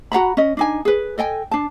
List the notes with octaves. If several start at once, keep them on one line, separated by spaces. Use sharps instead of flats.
F#4 F#5 A#5 B5
C#4 D#5
D4 D#4 G#5
G#4 B4
A4 D#5 G5 G#5
D4 A5